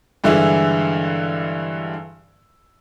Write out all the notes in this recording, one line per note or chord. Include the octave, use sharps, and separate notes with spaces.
G2 D3 E3 G#3 E4